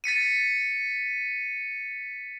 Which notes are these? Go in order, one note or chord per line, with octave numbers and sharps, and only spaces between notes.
A6 B6 C#7 D#7